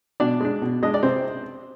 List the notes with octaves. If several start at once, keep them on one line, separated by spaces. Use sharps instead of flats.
B2 D4 D5
G#3 D4
B2
G#3 D4 D#5
D5
C3 C4 C5